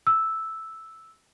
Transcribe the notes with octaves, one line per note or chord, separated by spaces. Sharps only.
E6